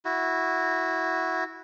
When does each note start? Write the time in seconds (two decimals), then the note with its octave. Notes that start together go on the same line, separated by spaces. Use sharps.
0.05 E4 F#4